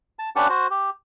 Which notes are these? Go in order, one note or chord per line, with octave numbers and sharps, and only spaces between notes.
A5
C#4 D4 G4 B4 F#5 A5
F#4 C5
G4